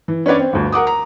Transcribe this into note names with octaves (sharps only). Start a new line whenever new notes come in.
E3
C#4 D4 B4 C#5 D5
C4
G1 D2
A#4 F#5 D6 D#6
A#5